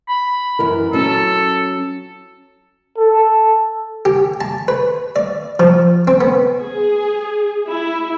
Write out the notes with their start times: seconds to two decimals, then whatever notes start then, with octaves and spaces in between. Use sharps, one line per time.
0.08 B5
0.59 F#2 E3 A#4
0.93 F#3 C#4 A4
2.97 A4
4.05 G4
4.41 A5
4.68 B4
5.16 D5
5.60 F3
6.08 C4
6.21 B3
6.61 G#4
7.67 E4